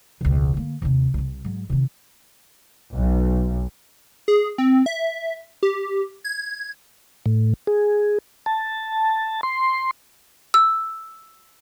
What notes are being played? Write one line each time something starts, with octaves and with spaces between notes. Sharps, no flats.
E1 C#2
D3 A#3
D#2 C3
C2 C3
G#2 F#3
C3 D#3
B1
G#4
C4
E5
G4
G#6
A2
G#4
A5
C6
E6